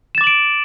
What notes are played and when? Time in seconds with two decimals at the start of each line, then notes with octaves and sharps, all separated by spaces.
0.15 E7
0.18 A6
0.21 D6
0.24 F#7
0.27 D7